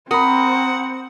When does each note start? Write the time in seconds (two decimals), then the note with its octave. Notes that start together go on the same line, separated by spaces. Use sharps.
0.11 C4 A#4 F#5 B5 D#6